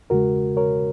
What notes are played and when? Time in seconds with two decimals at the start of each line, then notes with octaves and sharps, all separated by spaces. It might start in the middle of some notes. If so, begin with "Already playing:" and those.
0.10 E2 C#3 G#3 F#4 A#4
0.57 A#4 C#5